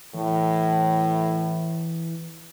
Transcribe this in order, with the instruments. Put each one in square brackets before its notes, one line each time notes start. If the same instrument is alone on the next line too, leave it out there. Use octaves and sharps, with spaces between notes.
[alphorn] A2 [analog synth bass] E3